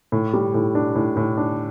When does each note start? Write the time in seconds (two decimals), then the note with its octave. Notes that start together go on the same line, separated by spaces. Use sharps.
0.12 A2
0.34 G3
0.54 A2
0.75 D4
0.95 A2
1.17 A2
1.37 D4